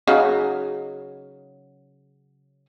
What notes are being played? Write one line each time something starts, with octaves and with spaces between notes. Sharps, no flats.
C#3 F#3 D#4